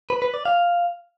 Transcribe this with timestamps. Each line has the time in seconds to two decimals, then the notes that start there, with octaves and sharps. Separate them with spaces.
0.10 B4
0.22 B4
0.34 D5
0.45 F5